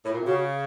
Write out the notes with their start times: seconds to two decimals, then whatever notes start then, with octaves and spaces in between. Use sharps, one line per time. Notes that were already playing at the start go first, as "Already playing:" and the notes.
0.05 A2
0.13 A#2
0.20 C3
0.26 C#3 F#4